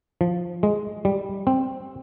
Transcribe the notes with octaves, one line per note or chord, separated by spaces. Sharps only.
F3
G#3
G3
C4